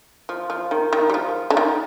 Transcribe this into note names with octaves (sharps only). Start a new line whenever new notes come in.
F3
F3
D#3
D#3
G3
F3
D3
D#3